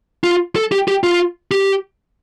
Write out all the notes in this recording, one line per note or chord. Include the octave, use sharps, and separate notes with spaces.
F4
A4
G4
G4
F4
G4